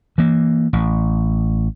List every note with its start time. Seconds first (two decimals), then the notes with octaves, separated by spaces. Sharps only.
0.18 E3 A#3
0.73 A1